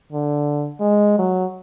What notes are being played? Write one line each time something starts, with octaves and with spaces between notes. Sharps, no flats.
D3
G#3
F#3